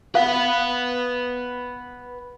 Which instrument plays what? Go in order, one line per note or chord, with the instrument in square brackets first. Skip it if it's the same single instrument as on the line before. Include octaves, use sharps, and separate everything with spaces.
[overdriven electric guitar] B4 F#5 [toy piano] F5